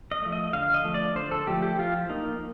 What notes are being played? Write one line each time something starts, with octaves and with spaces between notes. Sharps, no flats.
D#5
F3 A3
D#5
D3 F5
D#5
F3 A3
D5
D3 C5
A4
F3 A3 G4
G4
F3 F4
A#3 D#4